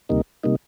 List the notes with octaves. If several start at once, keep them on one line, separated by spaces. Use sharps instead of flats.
D2 C3 G3 A#3 D#4
C3 G3 A#3 D#4